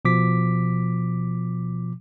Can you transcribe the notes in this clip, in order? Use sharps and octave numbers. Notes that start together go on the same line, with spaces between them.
B2 F3 D6 B6